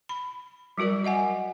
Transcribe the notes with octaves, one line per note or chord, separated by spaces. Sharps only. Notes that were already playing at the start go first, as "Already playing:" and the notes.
B5
F#3 G3 F#4 A#4 D5
D#5 E5 F#5 G#5